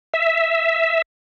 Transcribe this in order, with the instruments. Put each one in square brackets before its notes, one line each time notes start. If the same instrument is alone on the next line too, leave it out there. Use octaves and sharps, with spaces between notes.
[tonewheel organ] E5